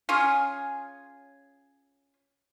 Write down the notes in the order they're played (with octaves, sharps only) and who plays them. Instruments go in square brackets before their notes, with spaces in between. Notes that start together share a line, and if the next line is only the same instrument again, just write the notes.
[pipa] C#4 F4 G#4